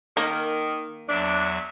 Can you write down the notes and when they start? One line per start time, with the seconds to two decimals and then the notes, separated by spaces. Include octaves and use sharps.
0.17 D#3 A#3
1.08 E2 F#3 D4 E5